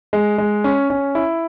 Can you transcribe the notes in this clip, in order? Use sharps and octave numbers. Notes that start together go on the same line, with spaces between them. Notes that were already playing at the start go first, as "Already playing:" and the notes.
G#3
G#3
C#4
C#4
E4